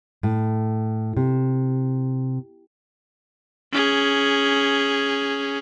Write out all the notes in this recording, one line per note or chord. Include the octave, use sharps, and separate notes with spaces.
A2
C3
C#4 G#4